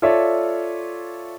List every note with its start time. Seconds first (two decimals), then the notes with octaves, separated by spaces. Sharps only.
0.02 F4 A4 C#5 D5 E5